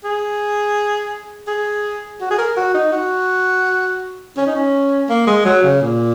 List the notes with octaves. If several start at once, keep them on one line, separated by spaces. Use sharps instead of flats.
G#4
G#4
F#4
G#4
A#4
F#4
D#4
F#4
C#4
D#4
C#4
A#3
G#3
F#3
C#3
A#2